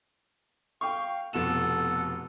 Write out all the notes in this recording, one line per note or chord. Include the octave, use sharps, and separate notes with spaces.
F5 G5 C#6
F1 B2 A4 F#5 E7